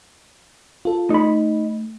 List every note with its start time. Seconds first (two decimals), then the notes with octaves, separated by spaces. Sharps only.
0.85 F4 A4
1.10 A3 D#4 B5